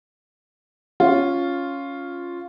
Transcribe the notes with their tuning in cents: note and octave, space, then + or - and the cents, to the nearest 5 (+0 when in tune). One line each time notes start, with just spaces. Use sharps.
C#4 +0 F4 +0